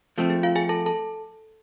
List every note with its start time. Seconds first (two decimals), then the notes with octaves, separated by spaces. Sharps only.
0.18 F3 A3 C4
0.30 G#4
0.43 F4 F5
0.56 G#4 G#5
0.69 A4 A5
0.86 A4 A5